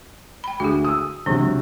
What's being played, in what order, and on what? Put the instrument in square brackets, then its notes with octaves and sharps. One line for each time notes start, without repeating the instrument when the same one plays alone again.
[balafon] G5 B5
[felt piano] D2 [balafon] F#4 G#4
[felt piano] D#6 E6
[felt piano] C#2 C3 F#3 [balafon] E3 D4